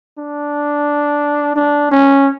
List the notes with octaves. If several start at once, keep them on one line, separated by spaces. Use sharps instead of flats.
D4
D4
C#4